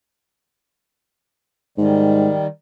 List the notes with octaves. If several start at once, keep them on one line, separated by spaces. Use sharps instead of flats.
G#2 D#3 G3